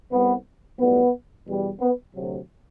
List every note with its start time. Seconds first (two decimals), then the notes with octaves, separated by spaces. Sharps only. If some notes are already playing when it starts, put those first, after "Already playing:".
0.11 C2 C3 G3 B3
0.78 B1 A2 G3 B3
1.46 E2 B2 G3
1.80 B3
2.14 D2 C3 F#3